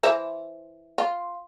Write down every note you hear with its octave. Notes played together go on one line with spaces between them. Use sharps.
E3 C5 E5
F4